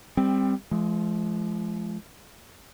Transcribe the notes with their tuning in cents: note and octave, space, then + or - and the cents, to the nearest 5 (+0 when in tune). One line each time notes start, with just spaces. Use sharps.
G3 +20 C4 +0
F3 -25 G#3 +35